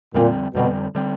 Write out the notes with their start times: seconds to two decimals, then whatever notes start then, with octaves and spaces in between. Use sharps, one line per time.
0.15 F2 A#2 D3 G3 C4
0.54 F2 B2 D3 G3 C4
0.95 D3 G3 C4